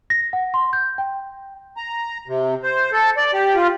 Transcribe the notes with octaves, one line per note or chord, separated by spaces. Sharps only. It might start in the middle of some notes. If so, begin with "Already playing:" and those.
A#6
F#5
C6
G6
G5
A#5
C3
C5
A4
D5
G4
F4